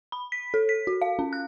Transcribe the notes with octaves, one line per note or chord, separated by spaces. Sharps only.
B5
B6
A4
B6
F#4
F5
C#4
F#6